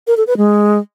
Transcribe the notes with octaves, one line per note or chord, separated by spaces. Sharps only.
A#4
A4
B4
G#3